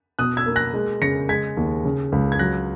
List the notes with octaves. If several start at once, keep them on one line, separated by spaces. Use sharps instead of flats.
B2 D#6 F#6
E6 G#6
A#3
F#6 A#6
G#3
C#3 A#6 C#7
G#3 G#6 B6
D#2
C#3
C#2
G#6
F#3 F#6 A#6